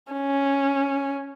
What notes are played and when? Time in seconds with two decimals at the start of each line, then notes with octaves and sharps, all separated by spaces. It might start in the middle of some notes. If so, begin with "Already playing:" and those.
0.13 C#4